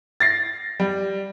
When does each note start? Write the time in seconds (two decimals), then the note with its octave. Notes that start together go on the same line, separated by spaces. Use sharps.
0.20 A6 A#6 C7
0.80 G3